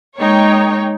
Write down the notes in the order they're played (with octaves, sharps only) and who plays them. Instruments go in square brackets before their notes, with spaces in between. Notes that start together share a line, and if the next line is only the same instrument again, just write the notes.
[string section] G#3 A#3 D#4 C#5 G5